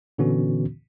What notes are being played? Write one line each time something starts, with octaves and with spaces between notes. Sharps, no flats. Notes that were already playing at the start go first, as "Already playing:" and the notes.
A#2 D3 E3 B3 C#4 F#4